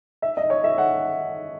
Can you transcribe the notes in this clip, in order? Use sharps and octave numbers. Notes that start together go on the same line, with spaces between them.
E5
D#5
C#5
E5
F#5